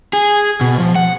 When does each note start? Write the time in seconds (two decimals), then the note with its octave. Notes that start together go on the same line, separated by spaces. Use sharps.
0.13 G#4
0.61 B2
0.79 F3
0.96 F#5